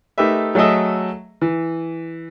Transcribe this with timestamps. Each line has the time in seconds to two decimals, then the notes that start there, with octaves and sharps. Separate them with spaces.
0.18 A3 D#4 G4 A#4 B4 E5
0.55 F#3 A3 G#4 A4 D#5 E5
1.41 E3